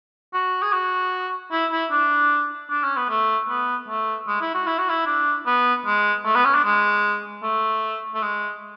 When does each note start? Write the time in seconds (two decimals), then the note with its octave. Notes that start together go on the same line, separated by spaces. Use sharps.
0.34 F#4
0.62 G#4
0.73 F#4
1.52 E4
1.71 E4
1.91 D4
2.70 D4
2.84 C#4
2.97 B3
3.09 A3
3.48 B3
3.88 A3
4.28 G#3
4.41 E4
4.54 F#4
4.67 E4
4.78 F#4
4.90 E4
5.07 D4
5.46 B3
5.86 G#3
6.25 A3
6.35 B3
6.45 C#4
6.55 D4
6.65 G#3
7.43 A3
8.15 A3
8.22 G#3